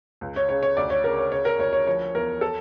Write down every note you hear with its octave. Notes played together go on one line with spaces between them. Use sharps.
C#2
C#5
C#3 C#5
C#5
D2 D5
C#5
C#3 A#4
C#5
C#3 C#5
A#4
D2 C#5
C#5
F3 C#5
E2 A#4
A4